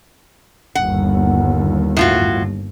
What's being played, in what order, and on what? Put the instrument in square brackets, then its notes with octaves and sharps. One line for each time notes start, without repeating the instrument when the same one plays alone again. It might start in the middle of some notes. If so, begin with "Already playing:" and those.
[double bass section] G1 D#2 [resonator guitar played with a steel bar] F#5
[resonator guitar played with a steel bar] A2 F4 F#4